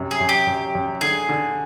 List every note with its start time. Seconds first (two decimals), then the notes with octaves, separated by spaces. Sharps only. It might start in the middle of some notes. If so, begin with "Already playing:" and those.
Already playing: F#2 C3
0.11 G#4
0.20 F#2
0.29 G4
0.47 F#2
0.75 F#2
1.01 D3 G#4
1.29 D3